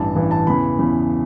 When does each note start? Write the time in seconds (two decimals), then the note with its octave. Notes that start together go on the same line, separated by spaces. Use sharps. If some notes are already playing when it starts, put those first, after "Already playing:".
Already playing: A1 G2 E3 A5
0.15 A1 G2 E3
0.31 A5
0.47 E2 C#3 E3 B5
0.79 E2 C#3 E3